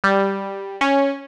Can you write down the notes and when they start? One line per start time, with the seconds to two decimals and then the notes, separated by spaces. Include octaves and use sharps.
0.04 G3
0.81 C#4